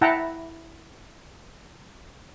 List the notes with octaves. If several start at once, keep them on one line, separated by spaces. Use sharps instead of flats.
E4 E5 F#5 G5 A5 A#5